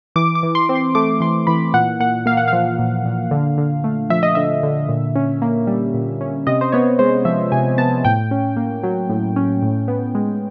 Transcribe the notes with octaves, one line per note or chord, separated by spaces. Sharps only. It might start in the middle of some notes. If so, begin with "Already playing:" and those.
E3 D6
D6
E3
C6
C4
C6
A3 D6
E3 C6
E3 B5
A#2 F#5
A#2 F#5
A#3 F5
F#5
F3 F5
A#2
A#2
D3
D3
A3
F3 E5
D#5
D3 E5
D3
A#2
C#4
A#3
G3
A#2
C#4
C3 D#5
C5
B3 C#5
G#3 C5
F3 E5
C3 G#5
B3 A5
A2 G5
C#4
A#3
F#3
A2
C#4
A2
B3
G#3